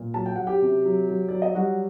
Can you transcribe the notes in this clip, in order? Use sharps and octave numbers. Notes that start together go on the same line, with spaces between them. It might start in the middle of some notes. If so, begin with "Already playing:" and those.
Already playing: A#2
F#3 A5
G5
F#3 F#5
G4 G5
C3
F#3
F#3
F#3 D5
D#5
G3 F#4 F#5